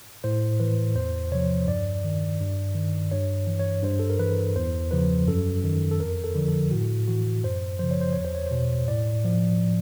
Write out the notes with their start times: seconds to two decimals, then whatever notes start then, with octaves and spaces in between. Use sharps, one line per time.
0.24 A2 C5
0.60 E3 B4
0.95 E2 C5
1.31 C3 F3 C#5
1.67 G2 D5
2.04 D#3
2.40 G2
2.75 D#3
3.11 G2 C#5
3.47 E3
3.59 C#5
3.83 G2 C5
3.99 A4
4.10 A#4
4.19 E3 B4
4.56 E2 C5
4.91 C#3 F3 B4
5.28 F#2 A4
5.64 D#3
5.91 A4
6.00 F2 A#4
6.24 A4
6.35 D3 F3
6.48 A4
6.71 A2 F#4
7.08 E3 F#4
7.44 F#2 C5
7.79 C#3 F3 C5
7.91 C#5
8.01 C5
8.13 E2 C#5
8.25 C5
8.35 C#5
8.46 B2 C5
8.88 A2 D5
9.24 F3